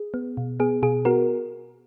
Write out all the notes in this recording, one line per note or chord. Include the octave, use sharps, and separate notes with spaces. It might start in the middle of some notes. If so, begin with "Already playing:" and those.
Already playing: G#4
B3
B2
B3 G#4
B2 G#4
B3 F#4 A#4